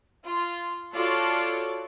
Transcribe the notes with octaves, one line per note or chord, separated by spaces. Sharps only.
F4
F4 F#4 A4 C#5 D5